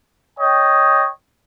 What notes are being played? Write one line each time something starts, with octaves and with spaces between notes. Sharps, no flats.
C#5 D#5 G5